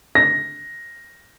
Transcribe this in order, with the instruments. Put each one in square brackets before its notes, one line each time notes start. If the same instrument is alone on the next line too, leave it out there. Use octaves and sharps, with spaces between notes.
[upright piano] A#6